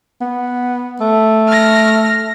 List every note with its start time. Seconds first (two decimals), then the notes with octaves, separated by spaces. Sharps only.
0.21 B3
1.00 A3
1.48 F6 A#6